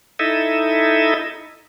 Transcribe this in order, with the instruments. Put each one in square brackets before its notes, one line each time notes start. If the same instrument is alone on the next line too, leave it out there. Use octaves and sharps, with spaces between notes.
[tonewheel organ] D#4 E4 A4 D#5 E5